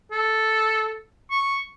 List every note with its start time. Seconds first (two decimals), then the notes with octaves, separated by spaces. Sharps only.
0.11 A4
1.31 C#6